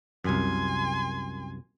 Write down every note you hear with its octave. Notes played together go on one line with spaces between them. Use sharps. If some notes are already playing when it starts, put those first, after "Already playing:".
C2 F#2 G#5 C6